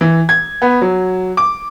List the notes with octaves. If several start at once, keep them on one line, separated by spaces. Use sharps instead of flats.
E3
G#6
B3
F#3
D6